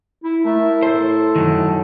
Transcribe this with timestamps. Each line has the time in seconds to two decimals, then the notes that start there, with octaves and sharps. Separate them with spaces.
0.24 E4
0.45 A3 A#4 E5 A5
0.60 E4
0.82 A2 A4 C5 A5
1.36 F#2 D#3